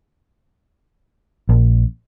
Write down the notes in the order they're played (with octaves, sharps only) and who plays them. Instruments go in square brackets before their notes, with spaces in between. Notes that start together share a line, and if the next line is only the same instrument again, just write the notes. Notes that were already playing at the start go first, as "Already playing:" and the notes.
[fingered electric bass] A#1